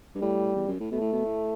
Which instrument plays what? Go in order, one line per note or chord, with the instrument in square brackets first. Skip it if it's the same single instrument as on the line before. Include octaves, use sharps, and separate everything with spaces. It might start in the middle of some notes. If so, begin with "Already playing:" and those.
[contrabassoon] G2
[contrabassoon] A2 [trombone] G3
[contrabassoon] E2
F#2
A2
[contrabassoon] B2 [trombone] A3
[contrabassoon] A2
B2
A2